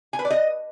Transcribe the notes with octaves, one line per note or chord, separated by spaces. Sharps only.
G#5
B4
D5
D#5